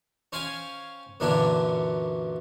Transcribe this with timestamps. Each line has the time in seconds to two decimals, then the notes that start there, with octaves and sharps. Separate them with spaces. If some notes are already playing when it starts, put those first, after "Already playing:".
0.32 C#4 C5 F5 G5 G#5
1.20 F#2 A#2 D3 E3 C#4 D4